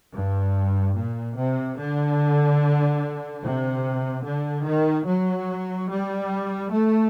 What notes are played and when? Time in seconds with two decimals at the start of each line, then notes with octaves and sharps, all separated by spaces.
0.13 G2
0.96 A#2
1.37 C3
1.79 D3
3.43 C3
4.25 D3
4.66 D#3
5.07 F#3
5.90 G3
6.72 A3